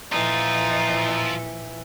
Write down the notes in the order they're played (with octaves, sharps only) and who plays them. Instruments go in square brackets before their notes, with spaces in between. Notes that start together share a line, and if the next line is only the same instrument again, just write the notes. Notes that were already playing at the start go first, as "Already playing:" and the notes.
[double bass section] A#2 F3 [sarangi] E3 [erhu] D#4 [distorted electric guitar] F4 A4